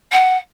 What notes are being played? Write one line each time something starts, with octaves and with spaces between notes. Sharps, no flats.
F#5